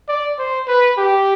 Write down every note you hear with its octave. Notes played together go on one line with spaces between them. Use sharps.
D5
C5
B4
G4